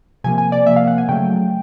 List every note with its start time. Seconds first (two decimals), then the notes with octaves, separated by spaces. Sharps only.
0.24 C3 F3 A#3 G#5
0.38 G#5
0.52 D5
0.66 C3 F3 A#3 E5
0.76 F5
0.87 F#5
0.98 G#5
1.09 C#3 F#3 A3 G5